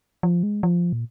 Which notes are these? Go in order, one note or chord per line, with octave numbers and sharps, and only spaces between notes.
F3
G#3
F3
A#2